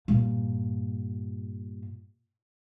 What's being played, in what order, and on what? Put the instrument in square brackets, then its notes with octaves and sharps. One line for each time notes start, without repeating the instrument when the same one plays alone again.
[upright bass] G2 A#2